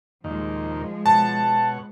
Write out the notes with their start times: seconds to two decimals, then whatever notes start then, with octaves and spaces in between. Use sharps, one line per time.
0.24 D#2 A#2 D#3 F3 G#3
1.06 B2 C#5 F#5 A5